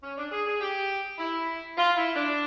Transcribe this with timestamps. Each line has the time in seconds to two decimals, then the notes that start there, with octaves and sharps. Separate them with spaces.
0.03 C#4
0.17 D4
0.32 G#4
0.46 G#4
0.61 G4
1.18 E4
1.77 F4
1.97 E4
2.15 D4